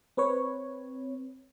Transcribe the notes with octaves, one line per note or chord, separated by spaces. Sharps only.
C4 B4 C#5